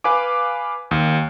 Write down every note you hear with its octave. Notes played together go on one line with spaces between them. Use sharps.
B4 F5 G#5 D6
D#2